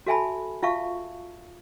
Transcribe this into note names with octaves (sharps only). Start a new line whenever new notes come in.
F#4 A4 E5 G#5 A5 B5
F4 E5 F5 A5 C#6